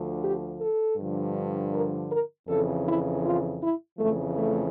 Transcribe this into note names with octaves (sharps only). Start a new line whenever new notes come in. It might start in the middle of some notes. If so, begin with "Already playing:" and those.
Already playing: D2 D3 F3
G4
A4
G2 D3 F3
A#4
A#4
F2 C#3 E3 A4
E4
F4
E4
F2 C#3 E3 A3
A3